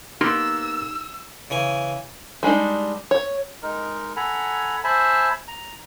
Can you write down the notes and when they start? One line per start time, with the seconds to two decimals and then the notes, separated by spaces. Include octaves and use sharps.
0.21 A#3 B3 D#4 G4 C6 E6
1.50 C#3 E3 G#5
2.43 G3 G#3 D4 D#4
3.11 C#5
3.63 G#3 D#4 A#4
4.16 A4 F#5 G#5 A#5 B5
4.84 C5 E5 G#5 A5 B5
5.48 A#5